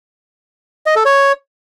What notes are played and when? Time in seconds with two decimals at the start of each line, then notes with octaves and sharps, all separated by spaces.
0.86 D#5
0.96 A4
1.06 C#5